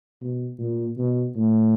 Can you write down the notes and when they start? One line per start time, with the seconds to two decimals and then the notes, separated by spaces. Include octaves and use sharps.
0.21 B2
0.59 A#2
0.98 B2
1.36 A2